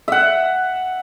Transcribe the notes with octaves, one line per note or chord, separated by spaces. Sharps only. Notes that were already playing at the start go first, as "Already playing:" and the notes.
E5 F#5